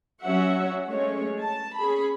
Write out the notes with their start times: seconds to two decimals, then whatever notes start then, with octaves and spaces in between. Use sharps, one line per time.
0.21 F#3 C#4 F#4 E5 F#5
0.88 G#3 A3 C#4 C#5
1.41 A5
1.78 C#4 G#4 B5